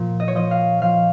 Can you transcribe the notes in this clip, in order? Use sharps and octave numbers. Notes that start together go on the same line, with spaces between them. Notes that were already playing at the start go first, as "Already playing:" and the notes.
Already playing: A#2 F3
D#5
C#5
F3 D#5
F5
F3 F5